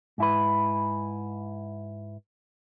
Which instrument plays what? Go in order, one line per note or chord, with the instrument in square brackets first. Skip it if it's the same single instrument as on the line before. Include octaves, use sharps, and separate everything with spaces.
[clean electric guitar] G#2 E4 B4